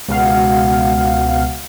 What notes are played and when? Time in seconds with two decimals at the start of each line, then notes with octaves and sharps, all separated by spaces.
0.08 C#2 B2 F#4 F5 F#5